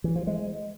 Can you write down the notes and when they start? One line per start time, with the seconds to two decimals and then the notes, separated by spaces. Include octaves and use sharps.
0.04 E3
0.16 F3
0.27 G#3